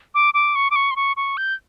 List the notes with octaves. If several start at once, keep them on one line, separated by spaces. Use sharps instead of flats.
D6
D6
C#6
D6
C#6
C6
C#6
C#6
G6